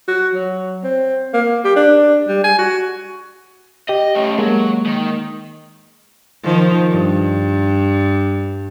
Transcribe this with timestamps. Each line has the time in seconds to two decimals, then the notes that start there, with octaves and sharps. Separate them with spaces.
0.08 F#4
0.34 F#3
0.84 C4
1.34 A#3
1.64 G4
1.76 D4
2.28 G3
2.44 G#5
2.59 F#4
3.89 G4 D#5
4.15 A3 C#4
4.39 F#3 G#3 A#3
4.86 D#3
6.43 D#3 F3
6.91 G2